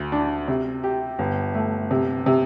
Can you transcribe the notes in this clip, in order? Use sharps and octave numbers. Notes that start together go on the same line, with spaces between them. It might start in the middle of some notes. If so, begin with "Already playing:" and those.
Already playing: D2
D4
C3
G4
G1
A3
C3
C3